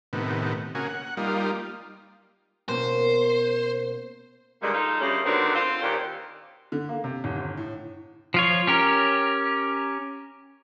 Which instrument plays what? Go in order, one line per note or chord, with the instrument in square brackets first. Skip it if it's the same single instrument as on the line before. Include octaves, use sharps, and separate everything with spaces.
[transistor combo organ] A2 C3 D#3 B3
C#3 A#3 F#4 G#4
F#5
G3 A#3 D#4 F4
[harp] B2 A#3 C#4 [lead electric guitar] C5
[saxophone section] G2 A#2 D3 D#3 G3 G#3
D#4 F4 A4
D3 G3 A3 A#3 C#4 G#4
D3 D#3 B3 C4 D4 F#4
C4 F4 A4 C5
D#2 A#2 D#3 G4 D5
[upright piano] D3
A#3
C3
D#1
G1
A2
[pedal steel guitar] F3 F4 C#5
C#4 G4 A#4